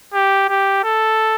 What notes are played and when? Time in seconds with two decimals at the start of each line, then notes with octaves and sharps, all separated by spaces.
0.14 G4
0.49 G4
0.84 A4